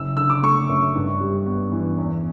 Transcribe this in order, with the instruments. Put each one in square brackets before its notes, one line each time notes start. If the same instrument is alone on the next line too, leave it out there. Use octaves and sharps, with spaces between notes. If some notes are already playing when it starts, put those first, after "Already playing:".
Already playing: [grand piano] F#1 E6
D3 E6
D6
A3 C#6
F#2
G2
G3
B3
E3
E2